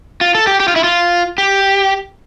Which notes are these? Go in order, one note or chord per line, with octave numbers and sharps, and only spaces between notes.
F4
A4
G4
G4
F4
E4
F4
G4